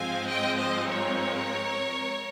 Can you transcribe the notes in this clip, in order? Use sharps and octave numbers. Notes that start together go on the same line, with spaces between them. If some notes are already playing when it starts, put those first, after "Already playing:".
Already playing: G#2 F3 G#3 C4 F5 G#5
D#5 G5
C5 D#5
A#4 C#5